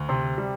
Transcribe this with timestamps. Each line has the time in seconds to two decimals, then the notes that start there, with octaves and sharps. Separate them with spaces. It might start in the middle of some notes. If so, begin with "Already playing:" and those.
Already playing: D2
0.09 C3 C6
0.38 G3